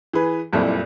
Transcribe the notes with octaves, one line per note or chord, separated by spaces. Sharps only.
E3 G#4 B4
F#1 F2 A#2 G3 E4